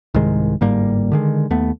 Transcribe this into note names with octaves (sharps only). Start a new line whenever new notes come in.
C2 G#2 D#3 G#3
G1 G#2 G3 A#3
D3 D#3 G#3
D#2 A3 B3